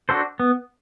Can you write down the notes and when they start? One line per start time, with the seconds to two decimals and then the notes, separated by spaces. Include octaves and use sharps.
0.09 D4 F#4 A4 C5
0.40 B3